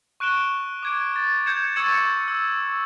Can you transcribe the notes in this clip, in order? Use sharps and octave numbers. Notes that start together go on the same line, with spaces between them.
C#6 F#6 D7 E7 G7
D6 G#6 D7
A6
G6 G#6 C#7 E7
C#6 E6 G#6 A6 C#7 E7
E6